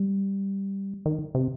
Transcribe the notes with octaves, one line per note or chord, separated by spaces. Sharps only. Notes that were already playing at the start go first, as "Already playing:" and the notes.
Already playing: G3
D#3
C3